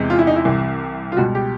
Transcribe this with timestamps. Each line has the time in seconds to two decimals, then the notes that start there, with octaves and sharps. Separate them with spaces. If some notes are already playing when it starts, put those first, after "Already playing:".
Already playing: E2 C3 E3 G#3
0.10 F4
0.19 E4
0.27 D#4
0.36 E4
0.45 C2 C3 E3
1.12 F4
1.17 C#2 B2 G3 F#4
1.35 G4